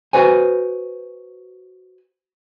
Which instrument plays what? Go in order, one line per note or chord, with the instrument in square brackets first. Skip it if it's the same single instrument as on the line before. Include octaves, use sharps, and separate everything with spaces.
[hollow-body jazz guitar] F#4 B4 C5 G#5